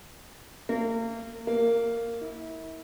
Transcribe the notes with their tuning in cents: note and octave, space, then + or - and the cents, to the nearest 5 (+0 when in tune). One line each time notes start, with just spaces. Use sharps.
A#3 -35
A#3 -10
E4 -35